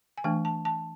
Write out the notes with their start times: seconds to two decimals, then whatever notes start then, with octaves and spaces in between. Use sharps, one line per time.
0.18 G#5
0.24 E3 A3 D4 G5
0.45 A5
0.65 A5